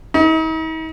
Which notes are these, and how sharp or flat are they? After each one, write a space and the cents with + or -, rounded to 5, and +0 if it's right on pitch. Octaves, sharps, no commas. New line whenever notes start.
D#4 +45